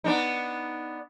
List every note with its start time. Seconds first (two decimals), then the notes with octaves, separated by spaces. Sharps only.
0.04 B3 D4 D#4